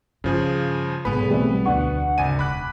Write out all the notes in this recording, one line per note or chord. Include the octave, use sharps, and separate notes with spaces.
G2 C#3 F3 G#4
B1 G#2 C3 B3 G#4 B4 B5
E3 G3 A3 C4
D2 D4 F#5 C#6
G#1 C#3 G#5 D#7
E1 B5 D6 F#6